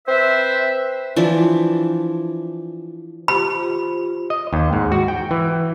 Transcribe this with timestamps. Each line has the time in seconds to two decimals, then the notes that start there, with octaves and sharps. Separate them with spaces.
0.07 C4 B4 C5 E5
1.16 E3 F3 D4
3.28 F4 G4 C5 B5
4.30 D#5
4.53 D#2
4.73 G#2
4.92 F#4
5.08 G5
5.31 E3